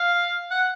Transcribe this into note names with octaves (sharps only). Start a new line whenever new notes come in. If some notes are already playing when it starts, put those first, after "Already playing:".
Already playing: F5
F#5